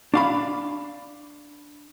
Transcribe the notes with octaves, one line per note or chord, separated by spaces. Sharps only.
D4 F5 B5